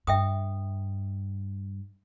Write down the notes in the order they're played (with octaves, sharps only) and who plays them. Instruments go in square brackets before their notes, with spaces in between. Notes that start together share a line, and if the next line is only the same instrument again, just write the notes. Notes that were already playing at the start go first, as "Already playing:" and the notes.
[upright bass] G2 [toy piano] E5 G5 D#6